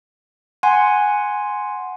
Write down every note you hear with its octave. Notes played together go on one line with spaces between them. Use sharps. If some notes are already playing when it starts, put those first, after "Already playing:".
F#5 G#5 C6